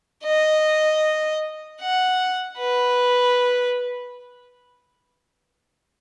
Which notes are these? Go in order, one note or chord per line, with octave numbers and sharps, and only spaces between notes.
D#5
F#5
B4